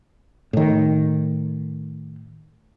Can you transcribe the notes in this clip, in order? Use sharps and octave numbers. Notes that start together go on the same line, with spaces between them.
A2 D#3